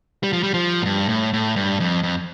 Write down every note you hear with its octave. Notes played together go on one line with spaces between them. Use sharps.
G3
F3
G3
F3
A2
G2
A2
A2
G2
F2
F2